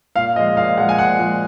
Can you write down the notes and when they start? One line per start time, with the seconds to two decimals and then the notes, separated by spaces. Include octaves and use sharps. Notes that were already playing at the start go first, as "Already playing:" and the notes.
0.16 A#2 F5
0.36 F3 G#3 D#5
0.57 A#2 F5
0.77 G#3 F#5
0.80 F3
0.89 G#5
0.98 A#2 F#5
1.19 F3 G#3